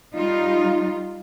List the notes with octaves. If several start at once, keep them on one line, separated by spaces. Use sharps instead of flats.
G3 D#4 F4